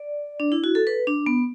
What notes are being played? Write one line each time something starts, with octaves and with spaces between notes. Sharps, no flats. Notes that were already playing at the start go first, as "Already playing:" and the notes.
Already playing: D5
D4
E4
F#4
A4
B4
D4
B3